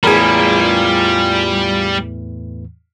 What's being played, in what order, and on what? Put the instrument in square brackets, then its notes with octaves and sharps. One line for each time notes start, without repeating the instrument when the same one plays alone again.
[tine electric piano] E2 A2 E3 [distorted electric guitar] G3 [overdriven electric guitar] F4 B5 [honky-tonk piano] G#4 A#4